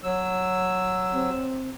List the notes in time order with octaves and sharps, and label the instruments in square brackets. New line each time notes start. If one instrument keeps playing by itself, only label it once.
[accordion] F#3 E6
[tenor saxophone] C4